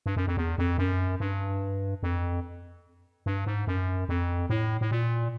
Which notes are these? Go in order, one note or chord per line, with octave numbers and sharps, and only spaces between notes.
G2
F#2
F2
E2
F2
F#2
G2
F2
G2
G#2
F#2
F2
A2
A2
A#2